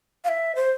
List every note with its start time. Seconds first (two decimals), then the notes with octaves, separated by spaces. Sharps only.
0.24 F5
0.29 E5
0.56 C5